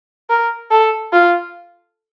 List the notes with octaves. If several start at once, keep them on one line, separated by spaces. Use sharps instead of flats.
A#4
A4
F4